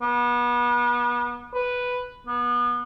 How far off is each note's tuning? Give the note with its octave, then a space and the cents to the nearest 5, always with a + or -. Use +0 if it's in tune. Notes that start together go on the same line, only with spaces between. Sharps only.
B3 -35
B4 +0
B3 -25